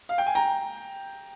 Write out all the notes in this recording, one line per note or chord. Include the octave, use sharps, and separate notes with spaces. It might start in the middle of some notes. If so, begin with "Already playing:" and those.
F5
G5
G#5
G5 A#5